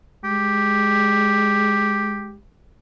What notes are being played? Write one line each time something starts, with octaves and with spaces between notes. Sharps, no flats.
G#3 G4